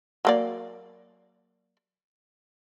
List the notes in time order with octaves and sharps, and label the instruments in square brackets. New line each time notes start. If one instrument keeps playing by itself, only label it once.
[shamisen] F#3 A#3 D5